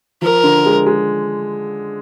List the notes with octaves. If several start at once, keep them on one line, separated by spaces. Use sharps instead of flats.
F3 A#4
D3
G#3
G#3